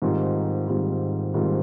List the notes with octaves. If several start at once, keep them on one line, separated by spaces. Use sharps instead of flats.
G#2 D#3 G3 C4 F4
G#2 D#3 G3 C4 F4
G#2 D#3 G3 C4 F4